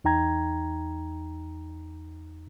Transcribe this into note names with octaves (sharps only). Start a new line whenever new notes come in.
E2 D#4 G5 A#5 G#6